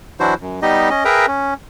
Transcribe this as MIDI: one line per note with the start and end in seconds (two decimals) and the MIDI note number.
0.20 0.34 52
0.20 0.34 54
0.20 0.34 62
0.20 0.34 64
0.20 0.34 66
0.20 0.34 72
0.41 0.60 42
0.62 0.90 55
0.62 0.90 59
0.62 0.90 63
0.62 0.90 67
0.62 0.90 75
0.90 1.04 61
0.90 1.04 75
1.05 1.26 68
1.05 1.26 70
1.05 1.26 71
1.05 1.26 76
1.05 1.26 79
1.05 1.26 82
1.28 1.54 61